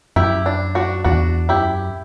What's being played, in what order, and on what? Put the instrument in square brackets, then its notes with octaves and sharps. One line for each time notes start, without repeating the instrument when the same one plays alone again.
[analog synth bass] F#2 [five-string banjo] E4 G4
[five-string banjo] D4
D4 F#4
[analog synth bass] E2 [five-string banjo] D4 F#4
[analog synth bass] F#2 [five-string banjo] E4 G4